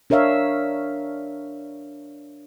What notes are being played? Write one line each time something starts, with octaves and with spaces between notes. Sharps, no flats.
D4 A#4 C#5 E5 F5